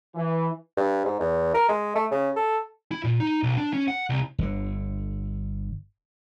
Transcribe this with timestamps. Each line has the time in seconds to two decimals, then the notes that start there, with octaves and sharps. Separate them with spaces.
0.15 E3
0.77 G2
1.05 G#2
1.20 E2
1.54 A#4
1.68 G#3
1.95 A3
2.11 C#3
2.36 A4
2.91 E4
3.04 A#2
3.20 D#4
3.43 B1
3.57 D4
3.73 C#4
3.88 F#5
4.10 C2
4.38 G1 D3